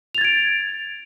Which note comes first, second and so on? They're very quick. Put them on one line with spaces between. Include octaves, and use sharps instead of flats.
F7 A6 G#6 D7